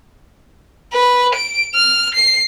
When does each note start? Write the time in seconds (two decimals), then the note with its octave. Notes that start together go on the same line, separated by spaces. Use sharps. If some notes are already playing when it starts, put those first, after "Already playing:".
0.93 B4
1.34 D7
1.75 F6
2.15 C7